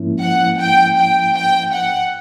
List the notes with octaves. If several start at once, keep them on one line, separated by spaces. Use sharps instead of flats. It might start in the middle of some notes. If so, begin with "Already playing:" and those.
Already playing: G#2 F3 A#3 C#4 E4
F#5
G5
G5
G5
F#5